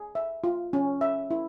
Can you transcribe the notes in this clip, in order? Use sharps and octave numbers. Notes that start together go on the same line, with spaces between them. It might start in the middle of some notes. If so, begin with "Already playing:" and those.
Already playing: G#4
E5
F4
C#4
E5
E4